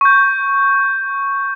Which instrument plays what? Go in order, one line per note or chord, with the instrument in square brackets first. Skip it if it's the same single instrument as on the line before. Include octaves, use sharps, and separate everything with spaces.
[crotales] C#6 G6